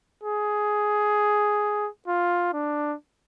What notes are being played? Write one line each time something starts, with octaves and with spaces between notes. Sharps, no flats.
G#4
F4
D4